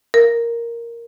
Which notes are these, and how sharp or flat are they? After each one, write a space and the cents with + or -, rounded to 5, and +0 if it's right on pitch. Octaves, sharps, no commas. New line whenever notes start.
A#4 +0